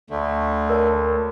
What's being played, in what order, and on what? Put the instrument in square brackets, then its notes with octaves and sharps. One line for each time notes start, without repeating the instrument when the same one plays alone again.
[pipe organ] D2 [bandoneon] D3 A3
[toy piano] A#4 C#5 A5